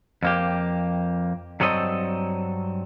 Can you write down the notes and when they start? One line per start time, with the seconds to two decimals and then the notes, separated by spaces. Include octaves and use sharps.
0.23 F2 A#3 G4
1.60 G2 F#3 C4 A4 D#5